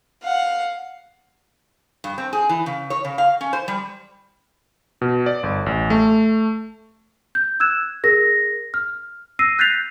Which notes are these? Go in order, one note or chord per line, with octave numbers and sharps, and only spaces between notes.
F5 F#5
G2
C4
G#4
E3
C#3
C#5
C#3
F5
C#4
C5
G3
B2
D5
G1
A1
A3
G6
E6 F#6 G#6 E7
G#4 A#4 A#6
F6
E6 A#6 C7 D#7
F#6 G6 A6 B6 C7 F7